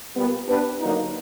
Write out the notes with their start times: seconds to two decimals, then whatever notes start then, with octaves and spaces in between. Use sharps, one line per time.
0.15 A#2 G3 B3
0.47 B3 D4 G4 B4
0.81 D3 F#3 A#3 D#4